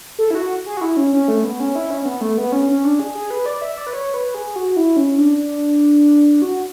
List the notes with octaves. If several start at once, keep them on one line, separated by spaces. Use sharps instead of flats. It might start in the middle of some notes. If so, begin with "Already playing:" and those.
A4
E4
F#4
G#4
F#4
E4
C#4
C#4
A3
B3
C#4
E4
C#4
C#4
B3
A3
B3
C#4
C#4
D4
G#4
G#4
B4
D5
E5
D5
B4
C#5
B4
G#4
F#4
E4
C#4
D4
F#4